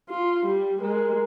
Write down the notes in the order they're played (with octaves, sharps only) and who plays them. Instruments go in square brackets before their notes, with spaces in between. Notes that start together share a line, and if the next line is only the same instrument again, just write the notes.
[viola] F4
G3
[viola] G#3 [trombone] A#4